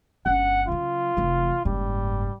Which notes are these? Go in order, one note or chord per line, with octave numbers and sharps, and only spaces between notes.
G1 C#4 F#5
C#3 F#3 F4
F1 E3
F#1 G#2 G3